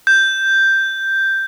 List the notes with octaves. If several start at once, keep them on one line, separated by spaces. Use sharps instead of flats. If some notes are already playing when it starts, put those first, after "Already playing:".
G6